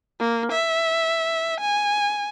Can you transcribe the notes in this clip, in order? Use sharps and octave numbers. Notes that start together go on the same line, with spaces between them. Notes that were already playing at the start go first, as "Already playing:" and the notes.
A#3
E5
G#5